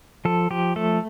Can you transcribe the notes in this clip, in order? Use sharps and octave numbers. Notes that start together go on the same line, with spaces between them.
F3 A4
F3 G4
A3 A4